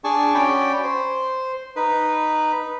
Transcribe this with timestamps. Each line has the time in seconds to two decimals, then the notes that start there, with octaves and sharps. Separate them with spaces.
0.04 D4 G#4 G#5 A5 C#6
0.34 C#4 F#4 C#5 D5 G5 B5
0.84 C5
1.76 D#4 B4